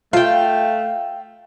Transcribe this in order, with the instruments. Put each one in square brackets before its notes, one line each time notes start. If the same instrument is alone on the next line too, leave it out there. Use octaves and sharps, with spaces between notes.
[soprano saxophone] A3 [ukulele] F4 [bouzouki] F5 G5